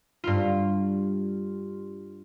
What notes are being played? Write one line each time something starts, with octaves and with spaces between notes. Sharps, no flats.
G2 F4